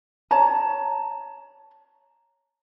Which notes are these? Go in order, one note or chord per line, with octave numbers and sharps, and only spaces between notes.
C#5 A5 A#5